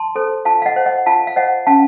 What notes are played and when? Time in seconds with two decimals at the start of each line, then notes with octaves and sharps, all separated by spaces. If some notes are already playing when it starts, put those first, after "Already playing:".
Already playing: A5 C6
0.16 A4 C5
0.45 F4 F5 A5
0.62 F5
0.66 D#5 F#5
0.76 C5
0.86 D#5 F#5
1.06 F4 F5 A5
1.27 F5
1.36 C5 D#5 F#5
1.67 C#4 F5 A5